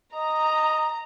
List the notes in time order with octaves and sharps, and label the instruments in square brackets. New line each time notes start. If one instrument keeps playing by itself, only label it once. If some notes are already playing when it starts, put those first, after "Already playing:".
[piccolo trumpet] D#5 [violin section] A#5